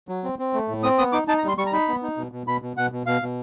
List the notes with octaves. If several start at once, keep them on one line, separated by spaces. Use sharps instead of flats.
F#3
C4
C4
A3
A2
C4 D#6
B3 D#6
D#4 D6
D#4 A5
A#5
G3 C6
G3 C#6
A#5
D#4 B5
B3
D#4
B2
B2
B2 B5
B2
B2 F#5
B2
B2 F5
B2